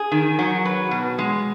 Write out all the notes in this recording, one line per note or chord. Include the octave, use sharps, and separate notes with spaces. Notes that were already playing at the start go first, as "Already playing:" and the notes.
Already playing: G#4
D#3
F#3
B4
B2
G#3